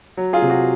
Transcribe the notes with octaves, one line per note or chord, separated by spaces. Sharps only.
F#3
F4 G#4
C3
F#4